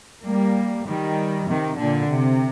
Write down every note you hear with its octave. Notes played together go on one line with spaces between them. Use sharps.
G3 A#3
D#3 G3
C3 D#3
A#2 D3
C3